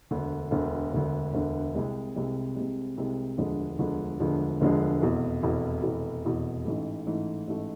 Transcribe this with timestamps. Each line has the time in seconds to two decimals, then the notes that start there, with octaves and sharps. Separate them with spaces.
0.11 E1 D2 D3
0.51 E1 D2 D3
0.93 E1 D2 D3
1.34 E1 D2 D3
1.75 C2 C3 G#3
2.16 C2 C3 G#3
2.56 C2 C3 G#3
2.98 C2 C3 G#3
3.38 E1 D2 D3 F3 G#3
3.79 E1 D2 D3 F3 G#3
4.20 E1 D2 D3 F3 G#3
4.61 E1 D2 D3 F3 G#3
5.01 F1 E2 B2
5.43 F1 E2 B2
5.83 F1 E2 B2
6.24 F1 E2 B2
6.65 A1 G#2 E3 A3
7.06 A1 G#2 E3 A3
7.47 A1 G#2 E3 A3